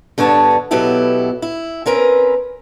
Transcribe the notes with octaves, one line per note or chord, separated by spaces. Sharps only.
G2 D3 B3 C#5 A5
B2 F#3 B3 E4 G4 A4
E4
C4 C#4 A#4 B4